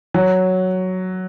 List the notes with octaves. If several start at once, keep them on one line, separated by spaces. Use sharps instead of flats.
F#3